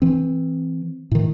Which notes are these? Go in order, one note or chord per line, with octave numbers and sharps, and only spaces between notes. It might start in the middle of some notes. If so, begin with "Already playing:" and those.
E3 C4
A2 D#3